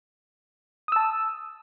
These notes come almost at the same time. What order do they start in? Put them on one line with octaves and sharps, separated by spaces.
D#6 E6 A5